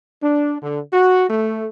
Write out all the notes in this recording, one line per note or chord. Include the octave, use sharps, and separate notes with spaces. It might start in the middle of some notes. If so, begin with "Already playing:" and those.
D4
D3
F#4
A3